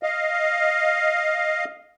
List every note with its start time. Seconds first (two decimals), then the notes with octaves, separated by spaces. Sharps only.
0.03 D#5 F5